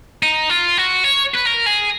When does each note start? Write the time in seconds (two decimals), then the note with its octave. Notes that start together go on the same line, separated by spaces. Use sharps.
0.23 D#4
0.50 F4
0.78 F#4
1.04 C#5
1.34 B4
1.45 A#4
1.66 G#4